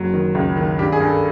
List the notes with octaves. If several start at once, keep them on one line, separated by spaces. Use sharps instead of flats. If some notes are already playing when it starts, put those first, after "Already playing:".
Already playing: F#1 F#3
D#3
C#2
D#3
G2 G4
G#4
G2
A4